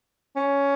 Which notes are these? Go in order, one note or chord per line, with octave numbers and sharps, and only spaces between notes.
C#4